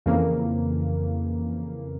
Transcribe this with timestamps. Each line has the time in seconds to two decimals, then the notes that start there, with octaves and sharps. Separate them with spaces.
0.06 F2 C#3 E3 A#3